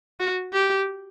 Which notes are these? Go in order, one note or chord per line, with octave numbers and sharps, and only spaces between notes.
F#4
G4